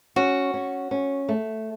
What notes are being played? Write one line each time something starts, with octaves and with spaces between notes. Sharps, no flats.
C#4 F#4
C#4
C#4
A3